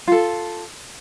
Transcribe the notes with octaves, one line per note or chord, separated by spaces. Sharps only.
F4 A4